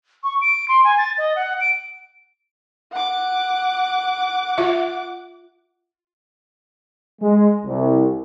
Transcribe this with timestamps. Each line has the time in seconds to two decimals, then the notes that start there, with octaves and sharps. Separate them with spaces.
0.23 C#6
0.41 D7
0.68 C6
0.84 G#5
0.98 A6
1.18 D#5
1.36 F#5
1.60 D7
2.92 F#5 D6
4.58 F4 E5
7.21 G#3
7.65 C2